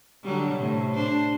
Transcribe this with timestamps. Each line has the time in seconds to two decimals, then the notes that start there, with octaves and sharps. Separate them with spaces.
0.23 D3 F#3 G3
0.56 A2 C3
0.94 D4 C5